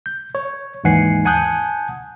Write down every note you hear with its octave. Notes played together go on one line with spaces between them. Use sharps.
G6
C#5
D#2 G#2 E3 F#5 G#5 C7
F#5 G#5 A5 D#6 F#6 G6